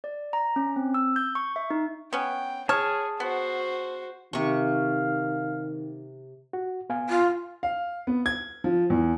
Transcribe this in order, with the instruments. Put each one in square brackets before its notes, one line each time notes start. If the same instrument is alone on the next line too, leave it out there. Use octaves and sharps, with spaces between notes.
[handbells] D5
A#5
C#4
C4
E6
G6
C#6
E5
D#4
[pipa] B3 C#4 [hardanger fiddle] G5
[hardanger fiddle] G#4 [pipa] C#5 [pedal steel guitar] A5 D#6 F6
[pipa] B3 [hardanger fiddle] F#4 C5
[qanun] C3 C#6 [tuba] D#3 [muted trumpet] F5
[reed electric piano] F#4
B3 F5 G#5
[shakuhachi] F4
[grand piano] F5
B3
G#6
F3
E2